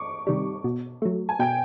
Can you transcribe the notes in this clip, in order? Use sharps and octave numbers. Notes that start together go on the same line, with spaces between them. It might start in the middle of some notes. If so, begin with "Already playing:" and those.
Already playing: C#6 D6
C3 D#3 G3
B2
F#3 A3
G#5
B2 G5